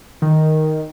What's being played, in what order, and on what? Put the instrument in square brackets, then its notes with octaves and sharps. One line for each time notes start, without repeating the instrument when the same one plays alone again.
[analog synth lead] D#3